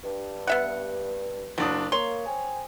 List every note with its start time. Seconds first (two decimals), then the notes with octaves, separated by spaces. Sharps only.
0.04 G2
0.47 B3 E5 F#5
1.58 F#1 F#3 D4 D#6
1.92 A#3 C#5 C6
2.26 C5 G5 G#5